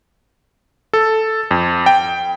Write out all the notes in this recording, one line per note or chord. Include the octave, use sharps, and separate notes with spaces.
A4
F2
G5